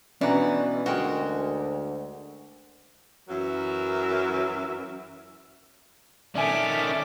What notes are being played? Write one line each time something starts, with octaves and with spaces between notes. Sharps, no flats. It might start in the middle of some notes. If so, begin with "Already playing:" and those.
B2 E3 C#4 D4 D5 F#5 A#5
D2 G#3 F#4 A#4 G5
F#2 E3 F#3 A#4 E5
D#3 C#4 A4 D5 E5 G#5 D6